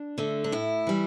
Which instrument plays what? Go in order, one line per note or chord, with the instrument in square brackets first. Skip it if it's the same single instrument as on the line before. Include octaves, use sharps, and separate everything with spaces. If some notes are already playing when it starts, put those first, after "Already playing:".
Already playing: [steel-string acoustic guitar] D4
D3 A3
D4
A2 E4
E3 G3